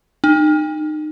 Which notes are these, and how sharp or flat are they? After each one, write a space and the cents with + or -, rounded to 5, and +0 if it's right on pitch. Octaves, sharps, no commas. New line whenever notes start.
D#4 -30